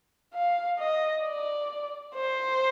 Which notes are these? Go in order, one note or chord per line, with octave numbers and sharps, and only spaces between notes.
F5
D#5
D5
C5